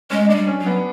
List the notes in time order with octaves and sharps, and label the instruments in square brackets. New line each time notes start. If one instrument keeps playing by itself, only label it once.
[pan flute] G#3 [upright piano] C#4
[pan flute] G#3 [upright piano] D4
[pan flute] G3
[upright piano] C#4
[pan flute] F#3
[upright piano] B3